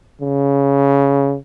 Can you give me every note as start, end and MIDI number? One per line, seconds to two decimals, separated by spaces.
0.22 1.36 49